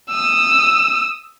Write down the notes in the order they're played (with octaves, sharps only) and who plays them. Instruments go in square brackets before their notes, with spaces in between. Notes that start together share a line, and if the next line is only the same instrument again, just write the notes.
[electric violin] D#6 E6